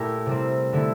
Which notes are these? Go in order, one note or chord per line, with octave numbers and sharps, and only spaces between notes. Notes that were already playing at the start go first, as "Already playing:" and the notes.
Already playing: A#2 A3 E4 G4 A#4
C3 G3 C4
D3 A3 E4